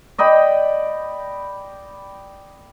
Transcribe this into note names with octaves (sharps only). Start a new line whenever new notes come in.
D5 D#5 G5 B5